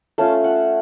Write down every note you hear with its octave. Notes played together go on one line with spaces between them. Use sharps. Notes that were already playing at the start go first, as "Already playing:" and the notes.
A3 C#4 F4 A5
F#5